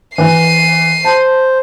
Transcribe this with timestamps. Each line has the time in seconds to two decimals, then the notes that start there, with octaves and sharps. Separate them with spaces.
0.18 E3 C7 D#7
1.05 C5 A5